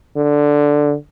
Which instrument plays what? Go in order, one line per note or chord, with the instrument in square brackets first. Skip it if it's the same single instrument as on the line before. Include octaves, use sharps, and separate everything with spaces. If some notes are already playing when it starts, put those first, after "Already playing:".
[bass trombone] D3